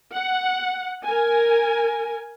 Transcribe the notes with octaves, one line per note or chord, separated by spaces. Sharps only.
F#5
A#4 G#5